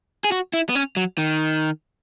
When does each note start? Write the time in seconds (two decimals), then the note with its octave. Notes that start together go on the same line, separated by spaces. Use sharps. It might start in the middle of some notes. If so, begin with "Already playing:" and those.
0.24 G#4
0.32 F#4
0.54 E4
0.69 B3
0.75 C#4
0.97 F#3
1.18 D#3